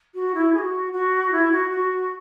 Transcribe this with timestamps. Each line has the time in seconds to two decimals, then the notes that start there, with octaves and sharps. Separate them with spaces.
0.14 F#4
0.34 E4
0.54 G#4
0.58 F#4
0.92 F#4
1.32 E4
1.51 F#4
1.70 F#4